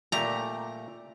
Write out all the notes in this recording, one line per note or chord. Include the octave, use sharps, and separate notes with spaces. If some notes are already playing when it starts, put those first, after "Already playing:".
A#2 A3 G4 A#5